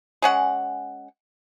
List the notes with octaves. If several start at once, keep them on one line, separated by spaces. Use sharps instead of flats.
G#3 C#4 F#5